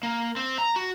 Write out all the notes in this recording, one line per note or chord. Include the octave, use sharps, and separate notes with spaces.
A#3
C4
A#5
F#4